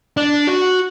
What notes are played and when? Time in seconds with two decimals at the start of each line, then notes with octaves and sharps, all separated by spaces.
0.17 D4
0.47 F#4